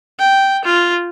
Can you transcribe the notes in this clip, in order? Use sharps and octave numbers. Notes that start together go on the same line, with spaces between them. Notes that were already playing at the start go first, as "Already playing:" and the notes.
G5
F4